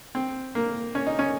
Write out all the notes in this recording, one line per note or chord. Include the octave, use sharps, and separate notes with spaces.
C4
A#3
C#4
D#4
C#4